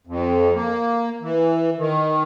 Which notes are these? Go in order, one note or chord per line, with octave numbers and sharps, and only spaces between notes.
F2
A#3
E3
D#3